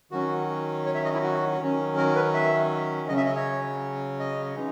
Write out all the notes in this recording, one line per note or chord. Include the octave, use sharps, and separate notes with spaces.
D#3 F#3 C#4 F#4
C#5
E5
D#5
E4
F#4
D#3 F#3 C#4
A#4
B4
E5
C#3 F#3 C#4 D#5
E5
D#5
C#5
D#5
E3 G#3 D#4